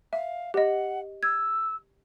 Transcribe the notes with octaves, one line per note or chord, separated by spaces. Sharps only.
E5 F5
G4 D#5 F#5
E6 G#6